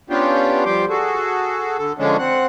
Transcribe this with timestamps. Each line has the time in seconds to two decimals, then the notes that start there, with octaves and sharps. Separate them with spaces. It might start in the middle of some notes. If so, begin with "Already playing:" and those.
0.10 B3 C#4 D4 F4 G4
0.65 F3 G3 G4 C6 D6
0.89 F#4 G#4 A4
1.78 D3 A4
1.98 D3 F3 G#3 C#4 D4
2.19 C4 F#5